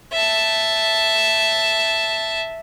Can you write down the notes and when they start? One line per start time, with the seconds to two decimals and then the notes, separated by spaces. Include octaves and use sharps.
0.13 E5 A5